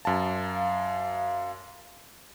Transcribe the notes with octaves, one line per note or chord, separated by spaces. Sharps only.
F#2 F5 A5